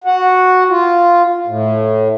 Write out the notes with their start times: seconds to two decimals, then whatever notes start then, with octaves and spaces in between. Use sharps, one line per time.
0.04 F#4
0.70 F4
1.47 A2